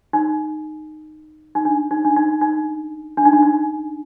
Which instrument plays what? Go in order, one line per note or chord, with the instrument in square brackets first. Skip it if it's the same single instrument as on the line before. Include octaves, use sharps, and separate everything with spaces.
[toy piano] D#4
D#4
D4
D#4
D4
D#4
D#4
D4
D#4
D4
D#4